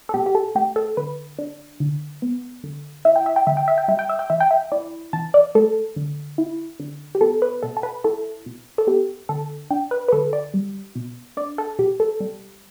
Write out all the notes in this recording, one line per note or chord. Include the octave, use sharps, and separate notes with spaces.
A4
B2 G4
G4
A4
A3 G4
A4
D3 B4
D4
D3
B3
D3
E4 E5
G5
E5
G5
D3 E5
G5
E5
G5
G3 E5
G5
E5
G5
E3 E5
G5
E5
E4 D5
E3 A5
D5
A3 A4
D3
E4
D3
G4
B3 A4
B4
B2 A4
A4
B4
E4 A4
B2
A4
B3 G4
D3 A4
D4 G5
B4
B4
D3 A4
D5
G3
B2
D4 D5
A4
B2 G4
A4
G3